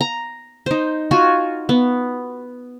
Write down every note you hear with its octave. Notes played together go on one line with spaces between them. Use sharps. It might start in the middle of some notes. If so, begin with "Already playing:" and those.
A#5
D#4 C5
F4 F#4 G#5
B3